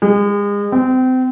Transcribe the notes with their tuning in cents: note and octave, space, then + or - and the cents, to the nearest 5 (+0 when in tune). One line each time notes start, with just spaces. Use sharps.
G#3 -35
C4 -30